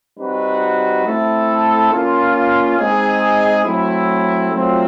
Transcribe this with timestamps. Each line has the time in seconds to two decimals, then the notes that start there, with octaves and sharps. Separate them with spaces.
0.18 G3 C4 D#4 F#4 B4
1.05 A3 C4 E4 A4
1.92 A#3 C#4 F4
2.78 G#3 C4 D#4 G#4
3.65 F#3 A3 C4 E4
4.51 F#3 A3 C4 F4